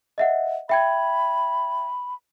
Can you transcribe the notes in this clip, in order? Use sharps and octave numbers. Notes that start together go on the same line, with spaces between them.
D#5 E5 F#5
E5 G5 B5 G#6